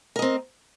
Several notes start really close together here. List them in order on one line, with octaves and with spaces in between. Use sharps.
A#4 D#5 C4